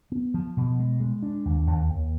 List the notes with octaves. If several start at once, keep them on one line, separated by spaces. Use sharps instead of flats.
B3
F3
B2
G#3
G#3
D4
D#2
D#2
D#2